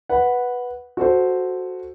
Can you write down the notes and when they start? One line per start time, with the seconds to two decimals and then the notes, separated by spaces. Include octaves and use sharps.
0.09 B4 F#5
0.97 F#4 A4 C5